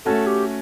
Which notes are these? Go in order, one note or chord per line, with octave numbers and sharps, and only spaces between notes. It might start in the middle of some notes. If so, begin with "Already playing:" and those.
A3 C#4 F#4 A4
G4